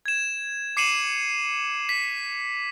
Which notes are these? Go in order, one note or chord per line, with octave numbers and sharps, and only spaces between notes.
G#6 E7
D6 C7 C#7 D#7 E7 F#7
B6